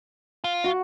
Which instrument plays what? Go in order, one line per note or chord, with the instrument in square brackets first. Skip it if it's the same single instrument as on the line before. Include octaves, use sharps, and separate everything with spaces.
[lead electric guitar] F4
[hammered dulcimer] F#4